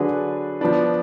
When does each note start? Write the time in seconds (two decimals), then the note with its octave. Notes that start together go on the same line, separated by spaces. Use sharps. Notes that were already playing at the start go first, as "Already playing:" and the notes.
Already playing: D3 F#3 D4 G#4 B4
0.61 F3 B3 D4